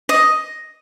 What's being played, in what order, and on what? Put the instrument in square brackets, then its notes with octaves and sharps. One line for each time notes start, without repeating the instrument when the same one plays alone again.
[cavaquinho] D#5